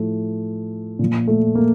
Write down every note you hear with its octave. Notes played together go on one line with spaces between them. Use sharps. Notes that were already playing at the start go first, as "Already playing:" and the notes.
Already playing: A2 F3 A3
A#2 F3
A3
A#3